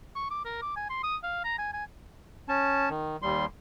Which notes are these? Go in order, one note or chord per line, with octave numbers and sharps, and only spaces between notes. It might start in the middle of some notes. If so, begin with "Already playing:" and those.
C#6
D6
A#4
D6
G#5
C6
D#6
F5
A#5
G#5
G#5
C#4 A5
D#3
D#2 G3 C6